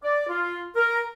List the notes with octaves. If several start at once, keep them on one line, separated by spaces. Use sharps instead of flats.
D5
F4
A#4